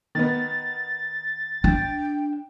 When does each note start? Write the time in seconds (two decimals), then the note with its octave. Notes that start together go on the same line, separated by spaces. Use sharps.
0.15 D#3 B3 A6
1.64 D4 G5